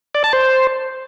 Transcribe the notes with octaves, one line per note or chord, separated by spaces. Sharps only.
D5
A5
C5